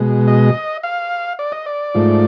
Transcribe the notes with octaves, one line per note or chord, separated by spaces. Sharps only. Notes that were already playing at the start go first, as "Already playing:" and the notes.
Already playing: B2 G#3
D#5
F5
D5
D#5
D5
G#2 F3 A3